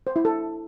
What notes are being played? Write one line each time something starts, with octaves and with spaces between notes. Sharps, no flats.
C5
E4
A4